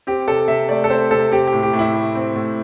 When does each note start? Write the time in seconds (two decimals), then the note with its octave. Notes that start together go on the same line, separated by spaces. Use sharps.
0.07 C4 G4
0.28 C3 A4
0.48 C3 E5
0.69 A3 D5
0.84 A4
0.90 C4 C5
1.11 C3 A4
1.32 C4 G4
1.47 G4
1.52 A2
1.63 G4
1.73 A2
1.79 E4
1.93 A3
2.15 C4
2.36 A2